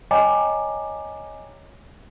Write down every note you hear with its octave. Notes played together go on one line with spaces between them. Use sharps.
C#5 D#5 G5 G#5 A#5 D6